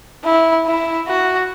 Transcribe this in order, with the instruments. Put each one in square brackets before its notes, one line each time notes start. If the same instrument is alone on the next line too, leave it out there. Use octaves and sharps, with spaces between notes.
[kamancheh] E4
E4
F#4